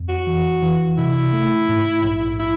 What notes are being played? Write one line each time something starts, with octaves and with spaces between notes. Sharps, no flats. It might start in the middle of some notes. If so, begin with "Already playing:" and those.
Already playing: F2
F#4
E3
E3
C3 E4
A3
G#2
A#1
E4